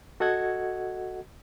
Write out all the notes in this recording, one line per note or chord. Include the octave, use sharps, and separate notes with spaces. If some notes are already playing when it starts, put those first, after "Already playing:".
F#4 A4 D#5 F#5 G#6